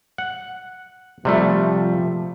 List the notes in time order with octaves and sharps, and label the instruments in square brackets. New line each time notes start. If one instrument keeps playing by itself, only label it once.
[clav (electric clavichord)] F#5
[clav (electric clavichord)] C3 G3 A3 [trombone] F3